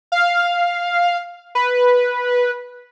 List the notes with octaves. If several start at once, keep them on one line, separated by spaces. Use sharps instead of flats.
F5
B4